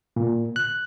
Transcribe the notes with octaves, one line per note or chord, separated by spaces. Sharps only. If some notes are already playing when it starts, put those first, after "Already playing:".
A#2
F#6